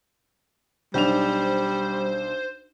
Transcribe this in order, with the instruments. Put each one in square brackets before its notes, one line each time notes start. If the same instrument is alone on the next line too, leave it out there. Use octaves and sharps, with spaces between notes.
[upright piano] B1 D4 F7 [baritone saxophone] G3 [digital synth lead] C5